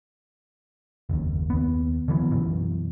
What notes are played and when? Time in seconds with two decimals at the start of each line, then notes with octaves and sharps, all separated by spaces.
1.09 F#1 D#2
1.50 D#2 B3
2.08 D3 E3 F#3 B3
2.31 F#2 B2 E3